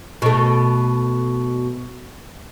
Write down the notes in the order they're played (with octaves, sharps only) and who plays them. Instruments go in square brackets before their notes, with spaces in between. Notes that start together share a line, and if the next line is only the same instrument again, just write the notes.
[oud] B2 A3